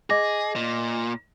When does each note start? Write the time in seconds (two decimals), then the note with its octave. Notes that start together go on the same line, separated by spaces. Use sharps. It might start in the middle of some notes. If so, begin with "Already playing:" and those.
0.10 G#4 D#5 D6 A#6
0.56 A#2